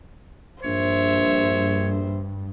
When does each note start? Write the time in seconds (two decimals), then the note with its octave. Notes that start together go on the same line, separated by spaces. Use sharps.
0.64 A#1 G2 C5 C#5 E5